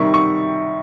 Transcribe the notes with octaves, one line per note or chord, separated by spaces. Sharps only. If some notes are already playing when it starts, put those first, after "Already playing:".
Already playing: C3 D#3 G3 C#6
C#6